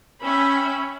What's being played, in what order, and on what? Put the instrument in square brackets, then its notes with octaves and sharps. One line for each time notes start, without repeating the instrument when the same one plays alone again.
[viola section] C#4 [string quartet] E5 G5 B5